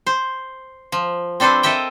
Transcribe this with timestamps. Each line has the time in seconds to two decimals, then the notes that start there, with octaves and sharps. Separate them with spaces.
0.07 C5
0.92 F3
1.40 C4 D4 A4 B4 C5
1.63 A4 A#4 D#5 E5 G5